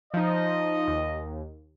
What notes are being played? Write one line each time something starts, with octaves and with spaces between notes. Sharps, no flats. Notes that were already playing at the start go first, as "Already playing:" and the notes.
F3 D#4 D#5
D#2